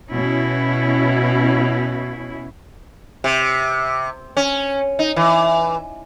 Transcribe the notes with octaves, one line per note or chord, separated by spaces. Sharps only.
B2 C#4 E4
C3
C#4
D#4
E3